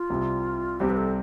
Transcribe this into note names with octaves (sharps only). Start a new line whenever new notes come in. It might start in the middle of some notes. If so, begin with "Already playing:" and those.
Already playing: F4
C2 C3 G3 C4
C2 C3 G3 C4 G4
B4
A4